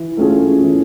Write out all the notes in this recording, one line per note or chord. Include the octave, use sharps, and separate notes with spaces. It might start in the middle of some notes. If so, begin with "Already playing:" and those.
Already playing: E3
A3 C#4 F4 G#4
E3